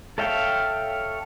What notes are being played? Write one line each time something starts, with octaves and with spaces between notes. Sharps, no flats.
A4 C#5 E5 F5 G5